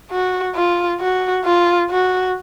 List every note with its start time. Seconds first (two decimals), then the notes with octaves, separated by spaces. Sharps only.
0.11 F#4
0.56 F4
1.00 F#4
1.45 F4
1.90 F#4